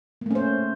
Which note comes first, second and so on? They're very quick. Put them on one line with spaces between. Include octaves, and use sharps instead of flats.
A#3 A3 C#4 C5